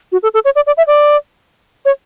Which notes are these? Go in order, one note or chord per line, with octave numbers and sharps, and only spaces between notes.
F#4
A4
A4
C#5
D5
D5
E5
D5
C#5